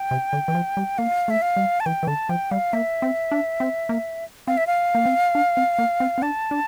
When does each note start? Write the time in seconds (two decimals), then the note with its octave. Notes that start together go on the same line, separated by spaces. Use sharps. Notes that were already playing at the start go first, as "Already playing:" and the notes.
Already playing: G5
0.11 C3
0.33 D3
0.48 E3
0.55 F3
0.77 G3
0.98 A#3 F5
1.28 A3 E5
1.42 F5
1.56 G3
1.80 A5
1.86 E3 G5
2.03 E3
2.07 D3 A5
2.29 F3 G5
2.51 G3 F5
2.73 A#3 E5
3.02 C4
3.32 D4
3.60 C4
3.89 A#3
4.47 C4 F5
4.57 E5
4.67 F5
4.95 A#3
5.06 C4
5.35 D4
5.57 C4
5.79 A#3
6.00 C4
6.18 C4
6.22 D4 A5
6.51 D4